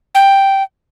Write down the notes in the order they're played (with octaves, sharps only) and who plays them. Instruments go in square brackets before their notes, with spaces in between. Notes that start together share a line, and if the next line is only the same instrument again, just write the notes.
[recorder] G5